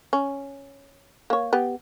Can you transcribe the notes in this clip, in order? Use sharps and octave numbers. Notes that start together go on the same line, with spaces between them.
C#4
A#3 C#5
B3 G4